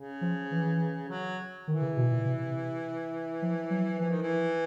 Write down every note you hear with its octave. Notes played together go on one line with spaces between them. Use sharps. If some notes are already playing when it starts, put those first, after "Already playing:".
Already playing: C#3
F3
E3
F#3
D#3 E3
C#3
B2
A#2
C3
F3
F#3
E3 F3
D#3
E3